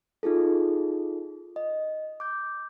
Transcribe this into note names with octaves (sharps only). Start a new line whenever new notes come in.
D#4 F4 G#4 A4
D#5
D6 G6